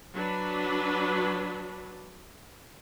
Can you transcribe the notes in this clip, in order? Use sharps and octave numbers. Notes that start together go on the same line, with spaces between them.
F#3 D4 B4